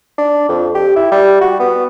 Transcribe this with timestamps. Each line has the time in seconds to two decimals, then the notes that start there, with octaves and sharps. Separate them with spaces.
0.18 D4
0.49 F2
0.75 G4
0.96 E4
1.12 G3
1.41 F#4
1.60 B3